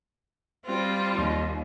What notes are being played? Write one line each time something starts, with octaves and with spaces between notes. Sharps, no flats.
G3 C4 F4
D#2